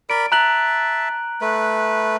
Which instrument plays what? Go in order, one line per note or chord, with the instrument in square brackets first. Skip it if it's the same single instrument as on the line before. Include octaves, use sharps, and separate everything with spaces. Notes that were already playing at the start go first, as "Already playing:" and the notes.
[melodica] A#4 D5 B5 [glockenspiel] D7
[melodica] E5 A5 [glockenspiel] A#5 F#6 F#7
[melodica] A3 B4